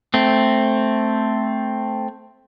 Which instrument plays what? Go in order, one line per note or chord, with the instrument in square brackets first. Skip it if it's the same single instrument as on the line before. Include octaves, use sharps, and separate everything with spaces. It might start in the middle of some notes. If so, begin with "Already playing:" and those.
[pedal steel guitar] A3 C4